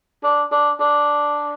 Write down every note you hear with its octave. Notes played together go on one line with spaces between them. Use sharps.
D4
D4
D4